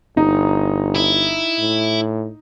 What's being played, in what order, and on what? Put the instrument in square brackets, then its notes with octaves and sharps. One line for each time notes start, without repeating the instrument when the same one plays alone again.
[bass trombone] G1 [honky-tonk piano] D#4
[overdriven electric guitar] E4
[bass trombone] A2